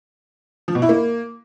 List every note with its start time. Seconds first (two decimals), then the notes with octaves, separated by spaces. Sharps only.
0.68 F3
0.75 B2
0.82 E4
0.89 A#3